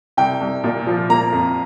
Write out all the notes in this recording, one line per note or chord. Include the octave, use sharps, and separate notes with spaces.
C2 G5
C2
A#2
F3
A#3 A#5
F2